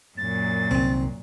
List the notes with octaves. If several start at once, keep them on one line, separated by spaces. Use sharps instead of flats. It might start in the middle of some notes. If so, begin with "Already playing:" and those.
F#2 A#2 A6
C2 D#3 C4